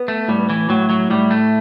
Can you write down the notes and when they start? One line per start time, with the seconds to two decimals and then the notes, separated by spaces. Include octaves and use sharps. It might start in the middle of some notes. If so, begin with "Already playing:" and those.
Already playing: B3
0.08 A3
0.28 A2 G3
0.49 E3
0.69 A2 F#3
0.90 F#3
1.10 A2 G3
1.31 A3